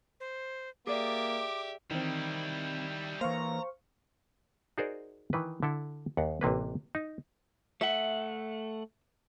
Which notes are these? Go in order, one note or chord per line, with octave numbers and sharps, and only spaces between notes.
C5
A#3 G4 G#4 D5 E5 D6
D#3 E3 G3 C4 E4
E3 A#3 C5 F5 A#5 C#6
D#4 F#4 G#4 A#4 C5 D5
D#3 E3 B4
D3 E4 A4
D#2 F#5
A1 C3 A#3 B4
D#4
A3 E5 F#5